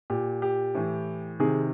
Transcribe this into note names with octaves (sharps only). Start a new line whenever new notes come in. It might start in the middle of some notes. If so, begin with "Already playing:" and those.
A#2 G4
G4
A2 E3
C3 D#3 G#4